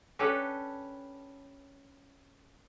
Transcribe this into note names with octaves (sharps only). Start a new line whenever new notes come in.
C#4 D4 G4 A4 B4 F#5